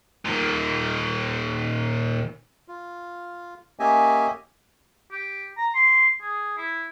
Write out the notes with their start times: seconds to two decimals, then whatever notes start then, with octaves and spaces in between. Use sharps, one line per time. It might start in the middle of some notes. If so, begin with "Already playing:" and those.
0.25 A#2 D#3
2.68 F4
3.79 A#3 C#4 G4 D#5 E5 G#5
5.12 G4
5.58 A#5
5.75 C6
6.22 G#4
6.58 E4